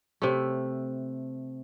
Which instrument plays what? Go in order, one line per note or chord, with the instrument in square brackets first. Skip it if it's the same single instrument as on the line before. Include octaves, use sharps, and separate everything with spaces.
[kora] C3 A3